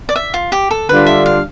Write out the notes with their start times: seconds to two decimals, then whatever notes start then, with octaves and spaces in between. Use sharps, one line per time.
0.09 D5
0.16 E5
0.34 F4
0.52 G4
0.71 A4
0.89 D3 G3 D4 F4 B4
1.06 E5
1.26 F5